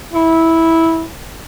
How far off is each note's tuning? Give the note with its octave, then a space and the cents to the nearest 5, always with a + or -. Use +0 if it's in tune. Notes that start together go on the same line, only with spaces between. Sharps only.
E4 -10